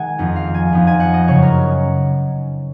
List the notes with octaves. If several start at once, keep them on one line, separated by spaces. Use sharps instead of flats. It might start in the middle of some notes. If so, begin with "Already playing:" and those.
Already playing: D#3 G#3 F#5 G#5
F2 F3 B3 D#4
F5
G#5
F2 F3 B3 D#4
G#5
F#5
D#5
F#2 C#3 F#3 C#4 C#5
A#4